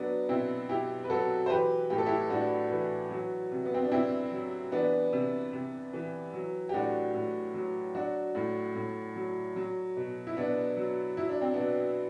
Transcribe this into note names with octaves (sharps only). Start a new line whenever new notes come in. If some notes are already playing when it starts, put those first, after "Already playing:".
Already playing: F#3 B3 D4
B2 C4 E4
B2 E4 G4
B4
F#3 F#4 A4
C5
E3 G4 B4
A2 G4
A4
E4 G4
A2 D4 F#4
E3
F#3
C3
B3
C4
D4
C3 C4 E4
F#3
E3 B3 D4
C3
C3
E3
F#3
G4
A2 D4 F#4
A2
F#3
F#3 D4 F#4
A2
A2
F#3
F#3
B2
E4
B2 B3 D4
F#3
F#3 E4
D4
C4
B2 B3 D4